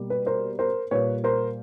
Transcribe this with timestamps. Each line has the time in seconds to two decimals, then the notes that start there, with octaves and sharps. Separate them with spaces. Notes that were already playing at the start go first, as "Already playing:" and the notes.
Already playing: B2 G3 A#3
0.10 B4
0.26 A#4 C5
0.59 A#4 C5
0.91 A#2 G3 A#3 B4 C#5
1.24 A#4 C5